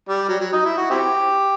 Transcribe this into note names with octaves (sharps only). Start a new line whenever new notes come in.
G3
F#3
F#3
D#4
E4
F#4
C4 E4 G4